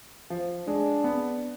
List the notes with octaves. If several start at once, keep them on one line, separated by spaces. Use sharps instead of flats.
F3
G#3 D4
B3